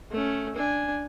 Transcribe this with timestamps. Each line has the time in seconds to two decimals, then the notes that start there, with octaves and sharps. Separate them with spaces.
0.12 A3 C#4
0.55 D4 G#5